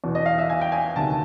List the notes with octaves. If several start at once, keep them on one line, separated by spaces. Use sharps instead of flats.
E2 B2
D#5
F5
E5
G#5
G5
G#5
D2 C3 D#3 A5